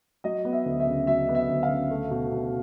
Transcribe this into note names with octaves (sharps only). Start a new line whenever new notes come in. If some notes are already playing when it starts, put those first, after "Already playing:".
F#3 D#5
B3
E5
D2
E5
C#3
F#3 E5
B3
E5
D2
F5
C#3
A3
B2
B2